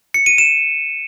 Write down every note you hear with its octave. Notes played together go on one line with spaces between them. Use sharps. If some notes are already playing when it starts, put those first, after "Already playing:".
C#7
D#7
E7